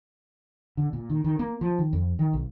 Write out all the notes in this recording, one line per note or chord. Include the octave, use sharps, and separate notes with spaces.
D3
A#2
D#3
D#3
A#3
F3
D#3
F2
D#3
B1